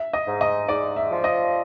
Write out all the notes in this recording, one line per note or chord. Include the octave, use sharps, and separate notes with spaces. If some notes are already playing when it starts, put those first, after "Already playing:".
Already playing: E5
D#5
G#2
D#5
G#2 D5
E5
F3
D#5